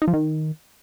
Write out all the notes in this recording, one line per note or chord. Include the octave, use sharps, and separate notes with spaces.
D#4
F3
D#3